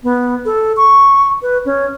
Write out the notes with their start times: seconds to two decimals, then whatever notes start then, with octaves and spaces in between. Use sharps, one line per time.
0.03 B3
0.45 A4
0.77 C#6
1.42 B4
1.65 C#4